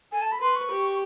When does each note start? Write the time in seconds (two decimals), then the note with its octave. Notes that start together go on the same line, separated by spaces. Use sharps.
0.12 A4 G#5
0.22 A5
0.32 B5
0.41 B4 C6
0.56 C#6
0.71 G4